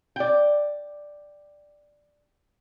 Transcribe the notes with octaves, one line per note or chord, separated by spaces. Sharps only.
D5 G5